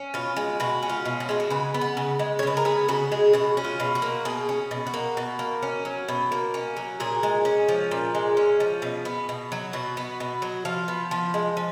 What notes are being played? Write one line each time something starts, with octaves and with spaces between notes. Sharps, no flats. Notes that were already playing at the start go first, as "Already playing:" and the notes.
Already playing: C#4
B2 F4
G#3
B2 F#4
C#4
F4
B2
F#4
G#3 F4
F#4
C#3 B4
B3
F#5
C#3
G#3
C#5
C#3 B4
A#4
B3 G#4
C#3 F#4
G#3 G#4
B2 F#4
C#4
F4
B2
F#4
A#3
B2 G#4
C#4
B2
F#4
A#3
B2
A#3
C#4
F#3
B2
A#3
C#4
F#3
A#2 G#4
G#3
C#4
F3
A#2
G#3
C#4
F3
B2
B3
B2
F#3
B2 F#4
B3
B2
F#3
F3 F5
B3
F3
G#3
F3